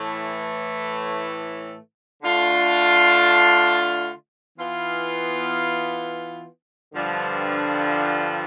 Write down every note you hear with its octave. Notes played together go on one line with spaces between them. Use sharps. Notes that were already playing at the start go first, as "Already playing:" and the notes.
Already playing: A2 E3 A3
D3 A3 D4 F4
E3 B3 F4
G2 D3 F3